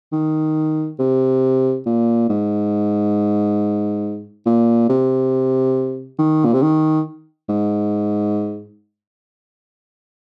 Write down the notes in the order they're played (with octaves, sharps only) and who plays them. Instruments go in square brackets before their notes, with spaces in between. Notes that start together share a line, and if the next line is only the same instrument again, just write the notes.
[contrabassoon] D#3
C3
A#2
G#2
A#2
C3
D#3
A#2
C3
D#3
G#2